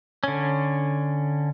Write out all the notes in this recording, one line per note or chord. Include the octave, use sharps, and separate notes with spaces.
D3 C#4